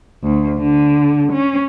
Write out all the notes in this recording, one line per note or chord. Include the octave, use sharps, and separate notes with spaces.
D2
D3
C#4